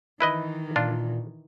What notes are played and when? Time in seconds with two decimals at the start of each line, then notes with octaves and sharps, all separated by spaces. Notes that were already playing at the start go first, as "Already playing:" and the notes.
0.21 D#3 E3 E4 B4 D#5
0.76 A#2 D4 F4